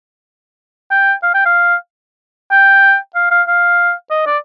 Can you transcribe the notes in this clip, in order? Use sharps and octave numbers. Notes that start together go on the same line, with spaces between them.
G5
F5
G5
F5
G5
F5
F5
F5
D#5
D5